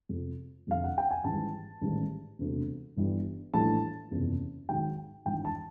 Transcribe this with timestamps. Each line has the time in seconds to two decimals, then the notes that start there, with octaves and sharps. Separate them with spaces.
0.09 F2 C3 F3
0.67 F1 F2 D3 F5
0.84 F#5
0.98 G5
1.11 G#5
1.24 G#1 G#2 E3 G3 A5
1.81 A1 G#2 D#3 G3
2.39 E1 D2 C3
2.96 G1 G2 E3 G3
3.54 A#1 A2 E3 G3 A5
4.11 F#1 E2 C3 F3
4.68 G#1 G#2 D#3 F#3 G5
5.25 G#1 G2 E3 G5
5.45 A5